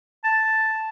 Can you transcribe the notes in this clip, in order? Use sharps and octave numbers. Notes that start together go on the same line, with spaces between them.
A5